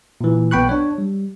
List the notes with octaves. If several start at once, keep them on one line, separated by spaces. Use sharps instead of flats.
A#2 E3
B1 B3 G5 B5 C#6 F#6
D4 C#5
G3